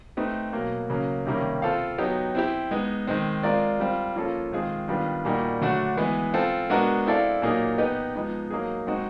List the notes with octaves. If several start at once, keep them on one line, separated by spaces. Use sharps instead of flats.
A3 C4 D#4 G4 B4
B2 F#3 A#3
C#3 F#3 A#3
C3 D#3 G3 A#3 C#4
C4 F4 A4 C5 F5
F#3 B3 D#4 G4
C4 E4 G4
G#3 B3 D#4
D#3 G#3 C4
G#3 C4 F4 A#4 D5
G3 C4 F4
F3 A#3 C#4 F4 A4
D#3 G#3 C4 F4 G#4
D#3 G3 B3 D4 F4
A#2 G3 A#3 D#4 F#4
D3 F#3 A3 D4 F#4
E3 G#3 B3
C4 F4 A4
G#3 B3 D4 F#4 A#4
C4 E4 A4 D5 F5
A#2 F#3 A#3 D#4 G#4
B3 D#4 G4 B4 D#5
F3 G#3 B3 D#4
F#3 A#3 D#4 G#4
G#3 C4 D#4 F#4